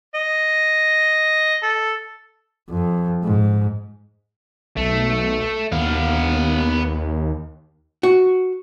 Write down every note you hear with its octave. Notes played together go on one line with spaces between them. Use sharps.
D#5
A4
F2
G#2
B1 A3
D#2 B3 F5
F#4